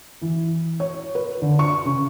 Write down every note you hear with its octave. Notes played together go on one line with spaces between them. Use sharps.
E3
C#5
B4
D3
C#6
C#3